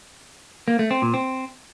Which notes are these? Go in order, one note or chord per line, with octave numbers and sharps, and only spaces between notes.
A#3
A3
C4
A#2
C4